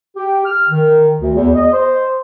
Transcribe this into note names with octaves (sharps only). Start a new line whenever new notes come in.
G4
F6
D#3
D2
E2
D#5
C5